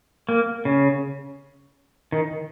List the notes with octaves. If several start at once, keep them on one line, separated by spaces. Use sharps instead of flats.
A#3
C#3
D#3